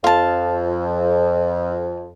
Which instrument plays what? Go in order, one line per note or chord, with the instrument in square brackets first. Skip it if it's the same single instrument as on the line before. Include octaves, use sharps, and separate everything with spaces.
[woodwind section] F2 [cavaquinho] F4 A5